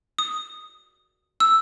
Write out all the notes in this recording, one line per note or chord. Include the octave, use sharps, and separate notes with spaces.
D#6
E6